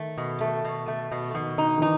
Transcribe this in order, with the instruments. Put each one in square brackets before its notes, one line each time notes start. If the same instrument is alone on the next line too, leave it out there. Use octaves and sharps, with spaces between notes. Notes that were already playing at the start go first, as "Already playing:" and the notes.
Already playing: [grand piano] D#3 [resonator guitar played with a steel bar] A3
[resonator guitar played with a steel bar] B2
A3
B2
A3
B2
[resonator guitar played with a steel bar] B2 [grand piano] D#3
[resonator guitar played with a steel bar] D#4
[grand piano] D#3
[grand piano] E3 [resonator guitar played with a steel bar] D#4